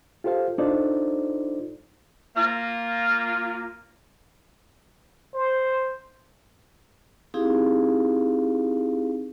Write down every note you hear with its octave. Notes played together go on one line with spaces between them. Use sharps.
F4 G4 A4 C5 F5
D4 D#4 F4 A4 C5 D5
A#3 F4
C5
C4 D#4 E4 G4 G#4 F5